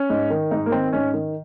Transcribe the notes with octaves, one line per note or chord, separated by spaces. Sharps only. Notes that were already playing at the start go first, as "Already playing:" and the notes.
Already playing: C#4
G#2
D#3
G#2 D#4
A#3
D#3 C4
G#2 C#4
D#3